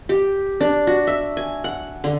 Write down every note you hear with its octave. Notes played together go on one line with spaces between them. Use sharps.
G4
D4
F#4
E5
G#5
F#5
D3